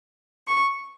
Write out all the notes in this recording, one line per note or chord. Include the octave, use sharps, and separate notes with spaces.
C#6